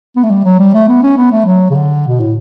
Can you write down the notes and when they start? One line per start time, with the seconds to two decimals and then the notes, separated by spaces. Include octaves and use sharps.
0.16 B3
0.23 A3
0.30 G3
0.45 F#3
0.59 G3
0.74 A3
0.88 B3
1.03 C#4
1.17 B3
1.32 A3
1.46 F#3
1.70 C#3
1.75 D3
2.08 B2
2.20 A2